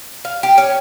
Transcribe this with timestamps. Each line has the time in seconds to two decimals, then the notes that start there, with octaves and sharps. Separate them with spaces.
0.25 F5
0.43 G4
0.58 C#4